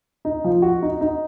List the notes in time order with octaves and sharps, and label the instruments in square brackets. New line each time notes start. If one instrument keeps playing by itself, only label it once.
[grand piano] D#4
F3
F#4
D#4
D#4